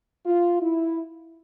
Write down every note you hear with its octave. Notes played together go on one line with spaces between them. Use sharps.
F4
E4